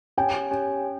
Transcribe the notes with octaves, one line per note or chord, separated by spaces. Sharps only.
C#4 G4 C#5 G5 G#5
C#4 G4 C#5 G#5
C#4